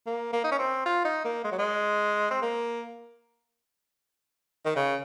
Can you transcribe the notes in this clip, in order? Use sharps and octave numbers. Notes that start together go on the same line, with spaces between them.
A#3
A#3
D#4
C#4
C4
F4
D#4
A#3
G#3
F#3
G#3
C4
A#3
D#3
C#3